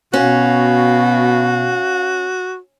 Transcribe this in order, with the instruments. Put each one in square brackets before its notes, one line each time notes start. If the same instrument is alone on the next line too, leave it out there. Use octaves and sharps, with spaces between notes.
[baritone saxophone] B2 [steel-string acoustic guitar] C#4 [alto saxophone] F#4 [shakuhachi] F5